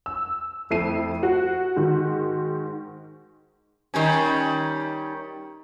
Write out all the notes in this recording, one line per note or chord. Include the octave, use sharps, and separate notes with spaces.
E6
F2 A3 E4 C7 D#7
F#4
G#2 D#3 F#4
D#3 G3 C#4